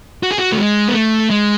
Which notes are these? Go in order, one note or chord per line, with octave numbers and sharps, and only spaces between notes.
F#4
G#4
F#4
A3
G#3
B3
A3
G#3